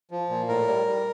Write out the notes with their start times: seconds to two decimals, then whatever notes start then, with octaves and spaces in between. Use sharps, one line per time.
0.11 F3
0.29 A#2
0.48 A2 A#4
0.68 G3
0.87 G3